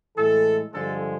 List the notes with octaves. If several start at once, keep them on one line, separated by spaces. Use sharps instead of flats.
A2 E3 G#3 A4
G2 D3 F3 G#3 A4